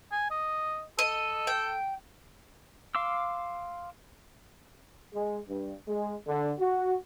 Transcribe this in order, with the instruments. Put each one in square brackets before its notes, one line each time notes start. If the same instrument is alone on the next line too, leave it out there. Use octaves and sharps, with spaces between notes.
[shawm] G#5
D#5
[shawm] A4 [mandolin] D#5
[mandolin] G5
[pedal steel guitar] F5 C6 D6 E6
[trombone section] G#3
G2
G#3
D3
F#4